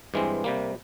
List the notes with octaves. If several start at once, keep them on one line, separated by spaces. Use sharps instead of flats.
G2 E3 G#3 C4
C3 G3 A#3